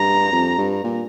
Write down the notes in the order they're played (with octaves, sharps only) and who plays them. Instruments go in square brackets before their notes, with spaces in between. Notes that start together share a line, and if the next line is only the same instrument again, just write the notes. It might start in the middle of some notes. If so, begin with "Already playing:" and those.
Already playing: [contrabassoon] G2 [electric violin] A#5
[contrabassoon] F2
G2
A#2